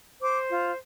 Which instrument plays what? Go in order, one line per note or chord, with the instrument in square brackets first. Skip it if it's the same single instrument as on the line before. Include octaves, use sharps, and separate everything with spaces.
[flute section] C5 D6
F4